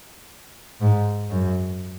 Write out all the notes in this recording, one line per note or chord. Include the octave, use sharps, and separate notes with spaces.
G#2
F#2